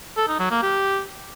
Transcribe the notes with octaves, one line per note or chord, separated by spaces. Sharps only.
A4
D#4
F#3
A#3
G4